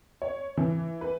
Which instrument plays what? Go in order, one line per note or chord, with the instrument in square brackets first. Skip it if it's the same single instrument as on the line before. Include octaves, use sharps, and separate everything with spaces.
[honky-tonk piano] C#5
E3
B4